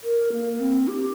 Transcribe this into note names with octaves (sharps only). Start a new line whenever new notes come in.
A#4
A#3
C4
G4